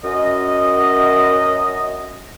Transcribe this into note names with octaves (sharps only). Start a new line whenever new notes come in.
F#2 D#5